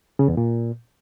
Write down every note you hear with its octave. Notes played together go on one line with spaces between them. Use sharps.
C#3
E2
A#2